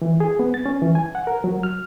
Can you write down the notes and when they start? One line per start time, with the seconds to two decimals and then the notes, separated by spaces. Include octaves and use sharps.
0.02 E3
0.20 G#4
0.39 B3
0.54 A6
0.66 C#4
0.82 E3
0.95 G#5
1.15 F#5
1.27 A#4
1.44 F#3
1.63 F6